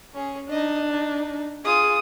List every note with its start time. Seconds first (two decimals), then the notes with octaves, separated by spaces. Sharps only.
0.14 C#4 G#4
0.50 D4 D#4 D#5
0.89 D#4
1.64 F4 G#4 D#6